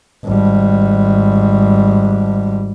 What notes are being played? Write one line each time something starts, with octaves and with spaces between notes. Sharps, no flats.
G#1 G3